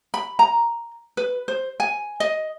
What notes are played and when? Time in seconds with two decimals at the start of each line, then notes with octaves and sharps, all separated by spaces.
0.14 B5
0.39 A#5
1.17 B4
1.48 C5
1.80 G#5
2.20 D#5